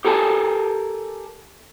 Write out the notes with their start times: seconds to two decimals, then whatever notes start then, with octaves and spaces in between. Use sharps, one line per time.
0.05 G4 A4 A#4 G#5 A5